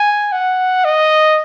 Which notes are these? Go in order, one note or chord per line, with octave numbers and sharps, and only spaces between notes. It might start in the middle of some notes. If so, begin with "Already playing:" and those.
Already playing: G#5
F#5
D#5